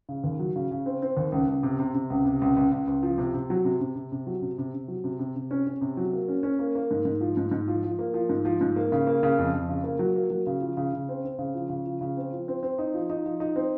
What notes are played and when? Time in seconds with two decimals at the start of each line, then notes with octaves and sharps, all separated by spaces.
0.09 C#3
0.24 D#2
0.39 F#3
0.56 C#3
0.71 C#3
0.86 C4
1.02 C4
1.17 D#2
1.32 C#2
1.48 C#2
1.63 C3
1.79 C3
1.94 C3
2.10 C#2
2.25 C3
2.42 C#2
2.57 C#2
2.71 C#2
2.87 C#2
3.03 F3
3.18 C3
3.34 C3
3.50 F#3
3.65 C3
3.80 C3
3.95 C3
4.12 C3
4.27 F#3
4.42 C3
4.58 C3
4.74 C3
4.88 F#3
5.04 C3
5.19 C3
5.36 C3
5.51 C#4
5.67 C#4
5.81 C3
5.97 F#3
6.13 A#3
6.28 C#4
6.43 C#4
6.59 A#3
6.75 A#3
6.91 G#2
7.05 G#2
7.21 F3
7.37 G#2
7.51 G#2
7.68 F3
7.83 F3
7.99 A#3
8.14 F3
8.29 G#2
8.45 F3
8.61 G#2
8.76 A#3
8.92 C#3
9.07 A#3
9.23 C#3
9.38 F2
9.54 F2
9.69 C#3
9.84 A#3
9.99 F#3
10.16 A#3
10.30 F#3
10.47 C#3
10.61 F3
10.77 C#3
10.93 C#3
11.09 C4
11.24 C4
11.39 C#3
11.54 F3
11.70 C#3
11.86 F3
12.01 C#3
12.17 C4
12.33 F3
12.48 C4
12.63 C4
12.78 D#4
12.94 F3
13.10 D#4
13.26 F3
13.40 D#4
13.56 C4